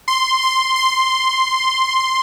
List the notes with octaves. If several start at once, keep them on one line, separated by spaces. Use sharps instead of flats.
C6
C6
C6